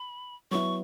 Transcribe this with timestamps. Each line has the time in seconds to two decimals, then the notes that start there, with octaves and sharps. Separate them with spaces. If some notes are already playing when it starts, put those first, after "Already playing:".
Already playing: B5
0.51 F#3 B3 E4 C#6